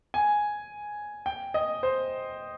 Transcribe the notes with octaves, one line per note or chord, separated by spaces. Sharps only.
G#5
G5
D#5
C5